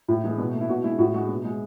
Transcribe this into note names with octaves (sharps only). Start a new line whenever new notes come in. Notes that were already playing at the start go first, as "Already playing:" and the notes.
A2
E3 G#3
B2
A3
E4
B2 F#4
G#3 E4
A2 F#4
G#3 F#4
B2
G#3